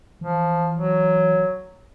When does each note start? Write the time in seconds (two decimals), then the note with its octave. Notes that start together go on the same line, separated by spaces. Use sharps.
0.21 E3 F3
0.77 F#3